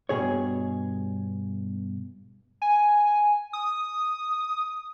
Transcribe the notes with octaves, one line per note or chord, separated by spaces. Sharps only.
G2 B2 G#4 C#5
G#5
D#6